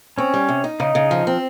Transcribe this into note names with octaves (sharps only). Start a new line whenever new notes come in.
C4 C#4 C#5
G3
C3
D#4
C#3 D#4 D#5
C#3
F3
C4